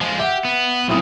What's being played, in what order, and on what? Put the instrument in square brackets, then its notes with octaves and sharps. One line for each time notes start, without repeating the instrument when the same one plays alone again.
[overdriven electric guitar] F3 G#3
[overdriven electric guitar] G4 [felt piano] E5 F#5
[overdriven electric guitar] B3
[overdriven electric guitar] B1 A#2 [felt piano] C4 E4 D#6